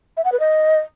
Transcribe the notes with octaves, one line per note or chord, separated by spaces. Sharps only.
E5
F#5
B4
D#5